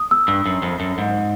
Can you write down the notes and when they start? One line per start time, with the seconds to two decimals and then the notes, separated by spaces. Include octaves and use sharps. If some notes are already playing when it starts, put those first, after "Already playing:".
Already playing: D#6
0.11 E6
0.28 G2
0.46 F#2
0.62 F2
0.80 F#2
0.98 G#2